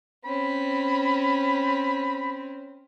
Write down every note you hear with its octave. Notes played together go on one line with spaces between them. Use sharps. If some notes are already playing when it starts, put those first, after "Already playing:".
C4 C#4 B5